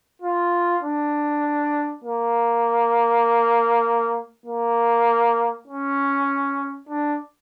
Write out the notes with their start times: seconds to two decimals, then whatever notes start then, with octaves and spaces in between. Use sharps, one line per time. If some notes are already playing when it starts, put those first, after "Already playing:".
0.22 F4
0.83 D4
2.04 A#3
4.46 A#3
5.68 C#4
6.89 D4